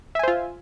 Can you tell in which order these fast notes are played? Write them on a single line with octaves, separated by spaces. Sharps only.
E5 G#5 C5 F4